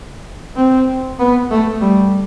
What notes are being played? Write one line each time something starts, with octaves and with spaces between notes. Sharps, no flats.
C4
B3
A3
G3